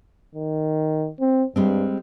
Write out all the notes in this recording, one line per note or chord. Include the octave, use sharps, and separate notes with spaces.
D#3
C4
G2 G3 G#3 C4